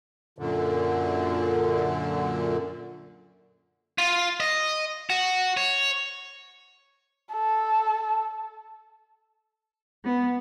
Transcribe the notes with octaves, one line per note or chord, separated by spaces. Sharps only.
F#2 A#2 D3
F4
D#5
F#4
C#5
A4
B3